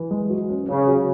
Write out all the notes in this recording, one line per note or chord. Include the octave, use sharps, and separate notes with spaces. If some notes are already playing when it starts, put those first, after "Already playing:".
Already playing: E3
G#3
F#3
C#4
C#3 C#4
F#3